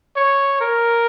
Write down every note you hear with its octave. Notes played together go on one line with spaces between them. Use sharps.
C#5
A#4